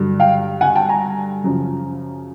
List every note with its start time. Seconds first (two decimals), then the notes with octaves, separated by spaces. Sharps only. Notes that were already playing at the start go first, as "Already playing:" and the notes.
Already playing: G2 D3 F#3
0.20 F5 G5
0.61 F#5 G#5
0.75 G5 A5
0.89 G#5 A#5
1.44 F#2 C#3 F3